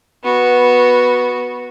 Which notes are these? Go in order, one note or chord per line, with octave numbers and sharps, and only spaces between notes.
B3 F#4